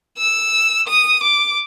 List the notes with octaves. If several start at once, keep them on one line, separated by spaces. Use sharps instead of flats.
E6
D#6
D6